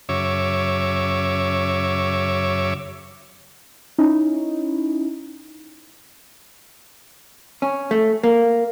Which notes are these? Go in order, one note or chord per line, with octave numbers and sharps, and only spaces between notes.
F#2 C#3 C#5 E5 D6
C#4 D#4 E4
C#4
A3
A#3